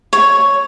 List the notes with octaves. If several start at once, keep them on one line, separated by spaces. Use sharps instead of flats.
C#5